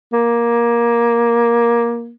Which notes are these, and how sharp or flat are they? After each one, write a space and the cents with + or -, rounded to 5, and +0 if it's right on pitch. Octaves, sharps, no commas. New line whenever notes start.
A#3 +15